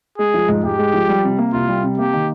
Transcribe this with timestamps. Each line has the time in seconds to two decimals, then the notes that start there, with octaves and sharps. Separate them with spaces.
0.19 G#3 G#4
0.34 F3
0.49 G#2
0.64 G#2 G4
0.79 G#3
0.94 F3
1.09 G3
1.24 C3
1.38 A#3
1.53 C2 F4
1.69 G3
1.84 C3
1.98 A#3 G4
2.13 D#3